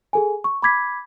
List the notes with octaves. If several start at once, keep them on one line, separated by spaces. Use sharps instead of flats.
G#4 A4 G#5
C#6
B5 D6 G#6 B6